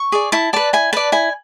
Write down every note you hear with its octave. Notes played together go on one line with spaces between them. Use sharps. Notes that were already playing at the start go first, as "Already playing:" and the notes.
Already playing: C#6
G#4 D5
E4 A5
B4 D5 A5
E4 G#5
B4 D5 A5
E4 G#5